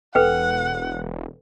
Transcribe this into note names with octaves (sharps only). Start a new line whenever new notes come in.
E1 A4 B4 F#5 G5